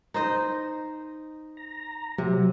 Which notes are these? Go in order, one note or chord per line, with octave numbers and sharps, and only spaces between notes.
D#4 C5 D#5
A#5
C3 F#3